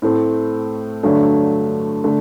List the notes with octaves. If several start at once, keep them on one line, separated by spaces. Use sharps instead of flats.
A2 A3 C4
G2 D3 F#3 A3
D3 A3